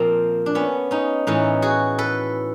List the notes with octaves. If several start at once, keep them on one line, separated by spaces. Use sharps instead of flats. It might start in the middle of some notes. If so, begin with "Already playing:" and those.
Already playing: A#2 F3 A#3 C4
D4
B3 C#4
C#4 D#4
A2 E3 C#4 D#4
F#4 G#4
A4 B4